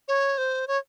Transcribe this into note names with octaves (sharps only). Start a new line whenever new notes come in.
C#5
C5
C#5